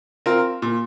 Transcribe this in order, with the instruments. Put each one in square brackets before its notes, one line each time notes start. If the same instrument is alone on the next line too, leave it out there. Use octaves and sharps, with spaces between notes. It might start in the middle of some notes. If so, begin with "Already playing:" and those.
[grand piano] C4 F4 A#4
A#2